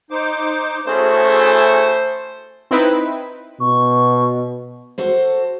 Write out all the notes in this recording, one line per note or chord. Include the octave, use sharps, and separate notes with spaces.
D#4 C5 D6
A3 C#4 E4 F#4 G#4 C5
C4 D#4 E4 B4
B2 C#6
F#4 A4 C5